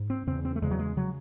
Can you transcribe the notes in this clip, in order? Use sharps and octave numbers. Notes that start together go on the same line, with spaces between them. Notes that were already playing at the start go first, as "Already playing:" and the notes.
Already playing: G#2
C4
E2 C#3 C4
C4
A3
E2 C#3 G#3
F#3
G#3
C#3 F#3